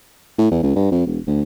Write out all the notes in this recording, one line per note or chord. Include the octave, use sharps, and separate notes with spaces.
A2
E2
C#2
G2
F2
E1
D2